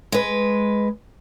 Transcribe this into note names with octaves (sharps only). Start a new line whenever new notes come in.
G#3 B4